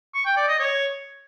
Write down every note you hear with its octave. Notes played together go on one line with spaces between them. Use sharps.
C#6
G5
D5
D#5
C#5